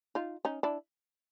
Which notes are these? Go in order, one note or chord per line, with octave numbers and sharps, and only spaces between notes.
D#4 F4
C#4 D#4
D4 E4